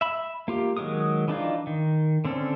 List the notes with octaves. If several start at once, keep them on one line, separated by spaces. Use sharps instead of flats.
E5 B5
A#3 F4 G4
D#3 F#3 G#3 A#4 D#6
E3 D4 D#4 F4
D#3
D3 C4 C#4 A4